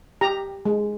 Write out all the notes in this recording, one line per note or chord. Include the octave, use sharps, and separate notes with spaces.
G4 A#5
G#3